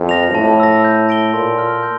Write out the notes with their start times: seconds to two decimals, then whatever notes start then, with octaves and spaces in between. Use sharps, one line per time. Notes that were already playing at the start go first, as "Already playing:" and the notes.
Already playing: F2
0.09 A#6 F7
0.34 A2 A5
0.60 E6 A#6
0.84 G6
1.09 A#6 D7 G7
1.33 A#2 C6
1.58 F6 A#6
1.83 G6